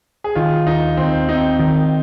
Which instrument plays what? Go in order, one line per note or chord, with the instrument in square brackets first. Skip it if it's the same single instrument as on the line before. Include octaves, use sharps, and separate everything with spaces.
[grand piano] G#4
[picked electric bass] D#3 [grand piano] F4
[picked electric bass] D#2 [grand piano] D#4
[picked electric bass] D#2 [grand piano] C4
[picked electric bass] C4 [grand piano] D#4
[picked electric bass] D#3